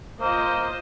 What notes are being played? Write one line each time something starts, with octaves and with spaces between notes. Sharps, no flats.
A#3 F4 C5 D#5